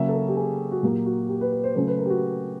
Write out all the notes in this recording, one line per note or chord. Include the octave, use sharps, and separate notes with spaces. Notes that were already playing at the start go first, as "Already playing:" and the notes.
Already playing: C#3 F#3 A#3 C#4 E5
A4
A#4
G4
G#4
F#4
A#2 F#3 A#3 G4
F#4
G4
B4
B4
C5
C#3 F#3 A3 C#4 C5
B4
A#4
G4
F#4